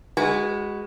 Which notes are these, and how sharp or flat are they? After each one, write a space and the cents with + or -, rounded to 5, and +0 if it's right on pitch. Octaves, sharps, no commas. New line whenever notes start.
G#3 -15 F#4 +10 B4 +0